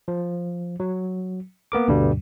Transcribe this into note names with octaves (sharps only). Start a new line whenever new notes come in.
F3
F#3
A#3 B3 A#4 D6
D2 G2 B2 D3 G3